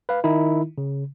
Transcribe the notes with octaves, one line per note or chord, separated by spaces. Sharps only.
B4 F5
D#3 D#4 E4
C#3